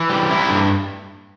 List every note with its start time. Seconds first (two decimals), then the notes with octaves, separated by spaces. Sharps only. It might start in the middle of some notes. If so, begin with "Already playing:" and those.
Already playing: E3
0.10 G3
0.30 E4
0.50 G2